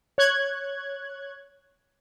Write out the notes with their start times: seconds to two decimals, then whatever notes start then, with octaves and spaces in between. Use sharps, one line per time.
0.18 C#5 F#6 G#6